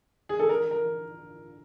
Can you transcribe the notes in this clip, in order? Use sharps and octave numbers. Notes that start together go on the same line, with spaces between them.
G#4
A4
A#4
A#4